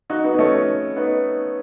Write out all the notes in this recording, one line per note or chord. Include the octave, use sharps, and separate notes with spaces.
D#4 F#4
B3 D#4
D#4
A3 C#4
B3 D#4